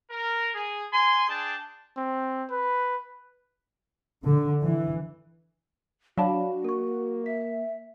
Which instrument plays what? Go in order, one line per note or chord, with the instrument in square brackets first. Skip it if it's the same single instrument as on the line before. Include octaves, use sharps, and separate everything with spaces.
[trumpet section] A#4
G#4
G#5 C6
D4 G#4 G5 A5
[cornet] C4
B4
[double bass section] D3
E3
[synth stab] F#3 D4 [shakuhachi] F#4 [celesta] F5 B5 E7
[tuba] A#3 [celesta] A#4 C#6
[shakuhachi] E5 [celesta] B6